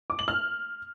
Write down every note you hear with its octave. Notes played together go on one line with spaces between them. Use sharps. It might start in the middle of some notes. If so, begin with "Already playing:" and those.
D6
F#7
F6